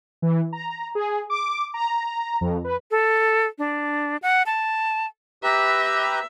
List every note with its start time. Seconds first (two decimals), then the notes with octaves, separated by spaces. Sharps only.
0.22 E3
0.53 A#5
0.95 G#4
1.30 D6
1.74 A#5
2.41 F2
2.64 B4
2.91 A4
3.58 D4
4.22 F#5
4.46 A5
5.43 G4 B4 E5 A#5